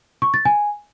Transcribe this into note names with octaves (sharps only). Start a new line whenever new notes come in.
C#6
A6
G#5